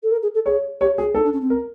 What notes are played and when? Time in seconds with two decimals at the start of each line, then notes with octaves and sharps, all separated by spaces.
0.03 A4
0.11 A#4
0.22 G#4
0.34 A4
0.46 G#4 C#5
0.81 G4 C#5
0.98 F#4 G#4
1.15 D#4 A4
1.24 D4
1.33 C#4
1.41 C4
1.50 A#4